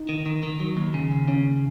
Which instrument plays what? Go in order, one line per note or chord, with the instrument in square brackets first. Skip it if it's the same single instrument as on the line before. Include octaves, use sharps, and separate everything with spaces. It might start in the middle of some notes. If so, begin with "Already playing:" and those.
Already playing: [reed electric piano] D#4
[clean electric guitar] D#3
D#3
D#3
F#3
D#2
C#3
D#2
[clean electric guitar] C#3 [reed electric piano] C#4